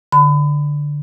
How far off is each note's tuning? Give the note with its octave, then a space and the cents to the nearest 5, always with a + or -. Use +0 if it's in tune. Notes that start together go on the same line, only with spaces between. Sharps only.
D3 +0 B5 +30